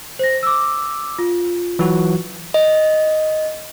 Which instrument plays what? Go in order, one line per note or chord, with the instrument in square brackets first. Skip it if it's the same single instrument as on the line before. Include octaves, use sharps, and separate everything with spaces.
[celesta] C5 A#6
D6 E6
F4
[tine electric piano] E3 F#3 F#4
[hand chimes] D#5